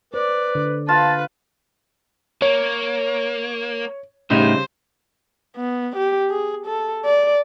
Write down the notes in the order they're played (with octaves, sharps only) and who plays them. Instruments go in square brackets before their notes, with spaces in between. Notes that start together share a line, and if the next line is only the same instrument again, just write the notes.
[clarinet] B4 [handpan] C5 [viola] D5
[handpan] D3
[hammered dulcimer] F4 [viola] B4 [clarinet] A5
[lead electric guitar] A#3 [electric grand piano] C#5
[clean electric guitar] A2 D#4 [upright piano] C#3 G3 [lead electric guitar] C5
[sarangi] B3
G4
G#4
A4
D5